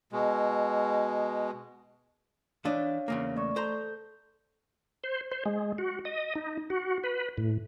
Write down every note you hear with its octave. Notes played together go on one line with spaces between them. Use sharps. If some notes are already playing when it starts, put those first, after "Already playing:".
B2 G#3
E3 D4 C#5 D#5 F5
E2 C#3 A#3
A3 D5 C#6
A4 C5 A#5 C6 G6
C5
C5
G#3
F#4
D#5
D#4
F#4
B4
A2